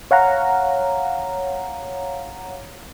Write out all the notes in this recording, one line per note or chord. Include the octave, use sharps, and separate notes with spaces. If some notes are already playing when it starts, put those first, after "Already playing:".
C#5 F5 F#5 A#5